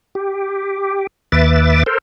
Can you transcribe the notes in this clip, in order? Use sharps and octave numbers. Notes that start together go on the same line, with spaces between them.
G4
D#2 B4 E5 D6 A6
A4 A#4 C5